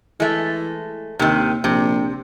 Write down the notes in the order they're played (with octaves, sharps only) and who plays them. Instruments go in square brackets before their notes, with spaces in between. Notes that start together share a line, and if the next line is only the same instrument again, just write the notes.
[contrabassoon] E3 [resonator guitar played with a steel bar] G#3 A3
[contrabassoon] D#2 [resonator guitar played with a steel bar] C3 D#3
[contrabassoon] A#1 [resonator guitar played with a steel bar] C3